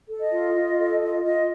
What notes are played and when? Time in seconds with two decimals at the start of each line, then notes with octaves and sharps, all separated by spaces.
0.08 A4
0.20 D#5
0.31 F4
0.55 F4
0.78 A4
1.01 F4
1.24 F4 D#5